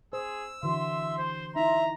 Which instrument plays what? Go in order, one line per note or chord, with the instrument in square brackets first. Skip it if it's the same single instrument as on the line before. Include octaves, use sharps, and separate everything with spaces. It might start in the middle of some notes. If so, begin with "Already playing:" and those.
[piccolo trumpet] G#4 [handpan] C5 [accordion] E6
[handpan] D3 E3 F#4 [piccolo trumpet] E5 [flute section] C6
[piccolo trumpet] C5
[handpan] D#4 E4 [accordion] E5 [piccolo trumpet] A#5